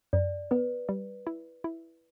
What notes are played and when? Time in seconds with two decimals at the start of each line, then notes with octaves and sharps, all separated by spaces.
0.13 F#2 D5
0.51 B3 B4
0.89 G3
1.27 E4
1.64 E4